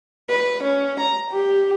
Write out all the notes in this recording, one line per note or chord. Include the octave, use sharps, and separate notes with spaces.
B4
C#4
A#5
G4